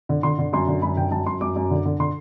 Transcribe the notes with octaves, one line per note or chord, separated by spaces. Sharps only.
D3
D3 C6
D3
F#2 C6
D3
F#2 B5
D3 G5
F#2 A5
F#2 C6
F#2 D6
F#2
D3
D3
D3 C6